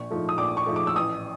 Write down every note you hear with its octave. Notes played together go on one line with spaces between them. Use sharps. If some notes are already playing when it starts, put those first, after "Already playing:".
Already playing: A#1 C#6
G#2 F3 A3
D#6
A#1 D6
C#6
G#2 F3 A3
D6
E6
A1 D#6